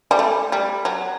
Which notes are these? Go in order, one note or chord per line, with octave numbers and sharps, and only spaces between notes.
G3
A3
G3
F#3